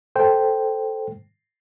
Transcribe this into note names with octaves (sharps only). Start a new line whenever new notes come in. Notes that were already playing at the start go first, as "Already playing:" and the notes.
A4 C5 G5